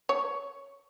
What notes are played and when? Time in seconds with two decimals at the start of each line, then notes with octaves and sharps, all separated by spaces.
0.09 C#5